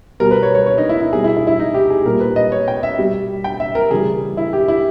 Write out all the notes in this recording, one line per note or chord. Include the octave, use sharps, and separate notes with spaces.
B2 G3 A#4
B4
C#5
C#5
C#5
D#4
E4
E4
B2 G3 G#4
E4
E4
E4
D#4
G4
G#4
A#2 G3 A#4
B4
D#5
C#5
G5
E5
B2 G3
G5
E5
A#4
C#3 E3 G3 G#4
E4
G4
E4